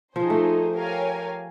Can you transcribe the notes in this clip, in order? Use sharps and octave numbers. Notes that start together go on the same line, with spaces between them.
F3 D#4 G#4 C5
A3
G4 A#4 C#5 F5 G#5